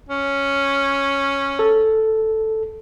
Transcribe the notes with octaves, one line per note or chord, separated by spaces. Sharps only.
C#4
A4